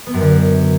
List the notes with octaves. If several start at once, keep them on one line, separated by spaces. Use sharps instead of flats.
B3
F#2
D3